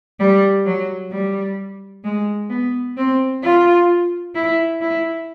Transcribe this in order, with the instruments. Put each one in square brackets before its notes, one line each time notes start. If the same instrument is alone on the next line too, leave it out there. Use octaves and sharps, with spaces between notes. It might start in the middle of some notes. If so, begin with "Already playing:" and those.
[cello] G3
F#3
G3
G#3
B3
C4
F4
E4
E4